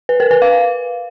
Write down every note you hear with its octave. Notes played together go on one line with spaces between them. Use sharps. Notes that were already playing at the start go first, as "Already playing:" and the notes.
B4
A#4
B4
F5